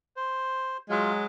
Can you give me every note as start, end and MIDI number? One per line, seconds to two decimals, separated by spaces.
0.16 0.77 72
0.90 1.26 54
0.90 1.26 56
0.90 1.13 65